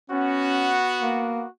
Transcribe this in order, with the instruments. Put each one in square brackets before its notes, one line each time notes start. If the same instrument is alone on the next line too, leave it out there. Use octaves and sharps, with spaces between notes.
[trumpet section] B3 F#4 [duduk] C#4
[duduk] A#3